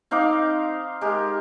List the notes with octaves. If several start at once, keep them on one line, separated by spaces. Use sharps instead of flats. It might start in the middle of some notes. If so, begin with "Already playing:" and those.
C4 D#4 F5 D6
G#3 G4 A#4